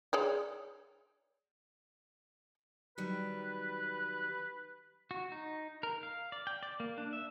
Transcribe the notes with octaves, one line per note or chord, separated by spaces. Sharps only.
G#4 C#5 D5
D#3 F#3 G3 B4
F#4
D#4
A#4
F5
D5
G5
D5
A#3
D4
E5